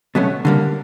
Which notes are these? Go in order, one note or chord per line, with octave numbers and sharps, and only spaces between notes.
B2 F#3 A3 C#4
D3 G3 A#3